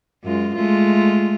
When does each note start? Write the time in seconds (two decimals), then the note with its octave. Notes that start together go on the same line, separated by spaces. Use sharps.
0.24 F#2 G#3 F4
0.55 G#3 A3 F4